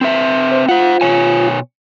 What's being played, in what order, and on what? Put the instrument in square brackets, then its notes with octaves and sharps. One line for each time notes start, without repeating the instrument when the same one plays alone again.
[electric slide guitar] C4 B4 E5
[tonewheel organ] C5
[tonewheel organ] F4 [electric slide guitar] C5 F#5
[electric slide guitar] B2 C#5 G#5